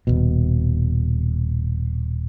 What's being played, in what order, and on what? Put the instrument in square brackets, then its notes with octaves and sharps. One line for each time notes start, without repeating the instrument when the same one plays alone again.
[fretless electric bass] D#1 G#1 B2